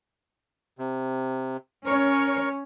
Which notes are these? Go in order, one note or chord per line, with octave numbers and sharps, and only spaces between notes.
C3
C#4 A#4 C#5 C#6